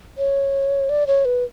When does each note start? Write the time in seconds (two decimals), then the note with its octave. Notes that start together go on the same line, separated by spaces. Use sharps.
0.18 C#5
0.89 D5
1.07 C#5
1.25 B4